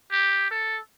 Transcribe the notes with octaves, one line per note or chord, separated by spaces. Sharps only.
G4
A4